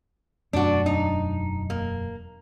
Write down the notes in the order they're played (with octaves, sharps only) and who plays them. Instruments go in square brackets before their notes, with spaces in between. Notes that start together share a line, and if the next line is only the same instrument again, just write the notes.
[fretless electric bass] E1 F#2 A3 [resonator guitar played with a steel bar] D4 F#4
[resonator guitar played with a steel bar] D#4
A#3